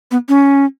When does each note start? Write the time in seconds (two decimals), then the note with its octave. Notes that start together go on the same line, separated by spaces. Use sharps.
0.11 B3
0.29 C#4